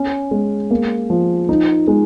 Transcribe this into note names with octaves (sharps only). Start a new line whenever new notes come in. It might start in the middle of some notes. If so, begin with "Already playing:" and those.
Already playing: C#4
G#3
A#3
F3
D#4
G#3